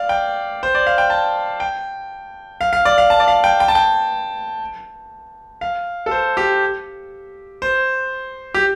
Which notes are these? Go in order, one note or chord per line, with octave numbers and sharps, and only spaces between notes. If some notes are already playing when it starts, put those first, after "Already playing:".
Already playing: D5 F5
G5
C5
D5
F5
G5
A5
G5
F5
F5
D5
F5
A5
D5
F5
G5
G5
A5
G5
F5
A4
C5
G4
C5
G4